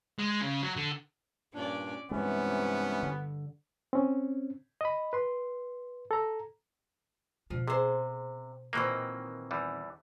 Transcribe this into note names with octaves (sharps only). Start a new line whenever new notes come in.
G#3
C#3
F#3
D3
G2 A#2 C#4 D4 D5
G2 C3 E3 G#3 B3 C#4
D3
C4 C#4
D#5 B5
B4 C6
A4 A#5
B2 F3 D4
C3 G#4 C5
A#2 D#3 E3 F#3 A#3 C4
E2 E3 G3